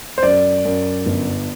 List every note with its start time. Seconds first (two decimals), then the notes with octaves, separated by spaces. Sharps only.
0.18 C5
0.23 F#2 D5
0.65 F#2
1.06 G1